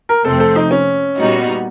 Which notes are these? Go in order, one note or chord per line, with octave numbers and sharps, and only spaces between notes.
A#4
F2 C3 F3 A3 C4 A4
A4
D#4
C#4
A#2 G3 B3 D#4 F#4